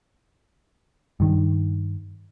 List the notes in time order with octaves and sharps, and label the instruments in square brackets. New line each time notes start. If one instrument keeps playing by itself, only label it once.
[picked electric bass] G2 D#3